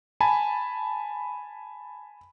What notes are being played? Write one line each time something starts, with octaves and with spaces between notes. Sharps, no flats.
G#5 A5 B5